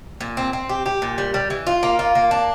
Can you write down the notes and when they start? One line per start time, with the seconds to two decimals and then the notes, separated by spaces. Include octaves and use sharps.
0.21 A#2
0.37 C4
0.53 C4
0.69 G4
0.86 G4
1.02 A#2
1.18 G3
1.34 G3
1.50 E3
1.67 F4
1.83 A#3
1.99 F4
2.15 A#3
2.31 D4